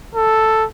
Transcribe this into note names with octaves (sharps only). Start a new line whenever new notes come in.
A4